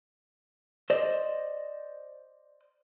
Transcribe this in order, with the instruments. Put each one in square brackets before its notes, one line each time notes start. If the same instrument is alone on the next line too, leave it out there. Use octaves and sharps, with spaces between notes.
[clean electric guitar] C5 D5 D#5